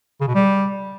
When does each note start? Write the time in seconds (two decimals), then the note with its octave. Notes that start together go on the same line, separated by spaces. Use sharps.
0.21 C#3
0.27 B2
0.34 G3